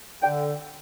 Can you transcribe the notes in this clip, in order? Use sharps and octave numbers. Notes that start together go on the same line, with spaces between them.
D3 G5